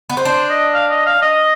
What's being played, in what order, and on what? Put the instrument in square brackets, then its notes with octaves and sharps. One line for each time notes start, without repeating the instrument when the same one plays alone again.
[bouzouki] B3
C4
[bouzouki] D4 [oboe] C5
[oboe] D#5
F5
D#5
F5
D#5